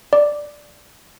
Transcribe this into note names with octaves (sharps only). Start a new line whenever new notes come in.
D5